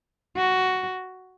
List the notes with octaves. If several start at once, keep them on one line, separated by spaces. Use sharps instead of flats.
F#4